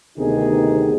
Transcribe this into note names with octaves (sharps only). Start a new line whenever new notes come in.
D2 C3 D#3 B3 D#4 G#4